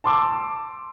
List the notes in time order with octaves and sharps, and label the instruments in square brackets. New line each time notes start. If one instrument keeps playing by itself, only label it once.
[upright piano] A5 C6 D6 E6